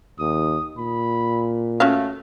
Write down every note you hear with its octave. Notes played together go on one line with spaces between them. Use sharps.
D#2 D#6
A#2 B5
A3 C#4 F#4 F5